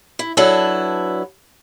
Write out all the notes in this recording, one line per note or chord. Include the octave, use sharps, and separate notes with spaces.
E4
F#3 D4 E4 A4 B4